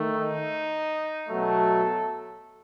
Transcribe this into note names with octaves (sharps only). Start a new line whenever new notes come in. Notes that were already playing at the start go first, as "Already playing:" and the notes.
Already playing: D#3 A3
D#4
B2 F#3 A3 A4